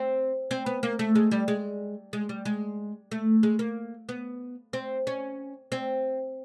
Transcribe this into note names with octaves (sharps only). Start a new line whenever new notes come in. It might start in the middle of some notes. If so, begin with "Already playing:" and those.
Already playing: C4
C4
B3
A#3
A3
G#3
G3
G#3
G#3
G3
G#3
A3
G#3
A#3
B3
C4
C#4
C4